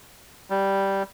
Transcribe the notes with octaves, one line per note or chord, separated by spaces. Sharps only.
G3